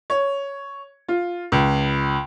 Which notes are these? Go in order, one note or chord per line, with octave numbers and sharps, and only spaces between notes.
C#5
F4
C#2